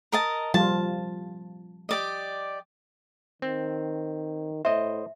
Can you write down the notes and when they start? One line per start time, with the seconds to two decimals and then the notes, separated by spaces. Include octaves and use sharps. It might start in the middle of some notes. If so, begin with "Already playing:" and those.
0.12 A#4 D#5 A5
0.54 F3 G3 F4 A5
1.89 G4 D5 D#5
3.42 D#3 C4
4.65 A2 C5 D#5 E5